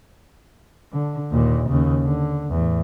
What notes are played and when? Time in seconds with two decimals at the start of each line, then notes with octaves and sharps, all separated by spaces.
0.93 D3
1.31 D#2 A#2
1.69 D#2 C#3
2.04 D3
2.50 E2 A2